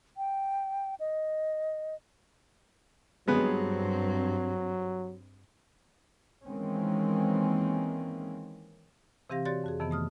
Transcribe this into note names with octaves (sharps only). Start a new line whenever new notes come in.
G5
D#5
G2 F#3 G#3 B3 C4
D#3 E3 G#3 A#3 C4 C#4
C3 E3 C4 G4 F5 A#6
F#4 G4 C#5 D5 C6 A6
F2 F#4 G#4
F2 C3 D#3 E3 B3
A3 D#6 F6